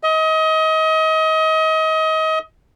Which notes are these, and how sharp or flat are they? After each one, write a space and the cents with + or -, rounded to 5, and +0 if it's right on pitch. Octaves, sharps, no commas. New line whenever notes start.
D#5 +30